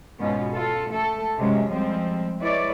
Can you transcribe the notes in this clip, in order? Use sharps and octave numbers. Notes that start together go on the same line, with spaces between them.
G#2 B2 C#4 F4
F4 A4
A3 A4
F#2 C3 F#3 G#3 C#4
F3 G3 G#3 C4
G#3 E4 B4 C#5 D5